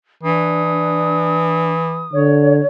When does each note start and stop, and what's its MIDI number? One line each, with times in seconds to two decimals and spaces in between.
0.24 2.09 52
0.24 1.70 62
0.24 2.18 87
2.13 2.61 50
2.13 2.66 73